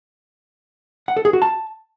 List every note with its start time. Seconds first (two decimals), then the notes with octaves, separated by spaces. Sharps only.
1.08 F#5
1.17 A4
1.25 G#4
1.33 F#4
1.42 A5